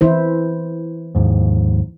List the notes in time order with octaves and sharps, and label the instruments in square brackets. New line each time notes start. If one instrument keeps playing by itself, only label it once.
[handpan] E3 E4 C5
[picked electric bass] D#2 G#2 F3